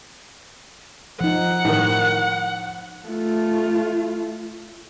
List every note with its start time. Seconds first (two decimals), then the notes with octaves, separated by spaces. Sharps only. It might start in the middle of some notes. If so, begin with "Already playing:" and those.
1.21 F3 D#4 F#5
1.65 A2 D#3
3.07 A3 F4